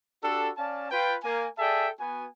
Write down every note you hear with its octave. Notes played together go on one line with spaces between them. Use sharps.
D4 F#4 G4 A4
C#4 D5 F5 A5
F4 B4 G5
A#3 G#5
G#4 A4 D5 E5 G5 A5
B3 F#4 G#5